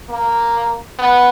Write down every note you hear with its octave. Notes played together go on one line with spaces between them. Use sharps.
A#3
B3